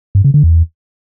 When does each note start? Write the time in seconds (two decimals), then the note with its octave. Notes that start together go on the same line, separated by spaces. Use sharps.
0.15 G2
0.24 C#3
0.34 D3
0.44 E2